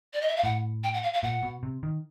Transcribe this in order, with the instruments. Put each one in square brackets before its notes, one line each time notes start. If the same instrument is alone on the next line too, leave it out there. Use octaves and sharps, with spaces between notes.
[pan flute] D5
D#5
E5
F5
[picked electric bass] A2 [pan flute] F#5
[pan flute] G5
F#5
F5
F5
[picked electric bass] A#2 [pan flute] F#5
[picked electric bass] B2
C3
D#3